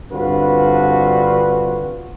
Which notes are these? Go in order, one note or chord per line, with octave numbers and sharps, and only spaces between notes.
G2 D3 C4 F4 F#4 B4